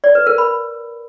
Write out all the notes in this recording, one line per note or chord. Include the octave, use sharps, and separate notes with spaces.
D5
B4
A#4
B5